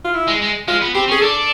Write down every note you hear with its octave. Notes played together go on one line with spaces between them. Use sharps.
F4
E4
G#3
G#3
G#3 F4
B3
C4 G4
C#4 G#4
D4 A4